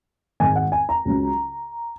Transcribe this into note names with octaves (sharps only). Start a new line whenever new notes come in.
G#1 G#2 D#3 G#5
F#5
G#5
A#5
C#2 C#3 F#3 C#4